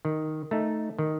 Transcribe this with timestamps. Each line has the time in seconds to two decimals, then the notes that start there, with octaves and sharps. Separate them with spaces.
0.05 D#3
0.51 A3 D#4
0.99 D#3